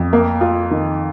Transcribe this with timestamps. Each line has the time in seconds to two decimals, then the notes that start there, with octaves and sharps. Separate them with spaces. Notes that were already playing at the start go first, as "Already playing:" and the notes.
Already playing: F2
0.13 A#3
0.41 F4
0.71 D#3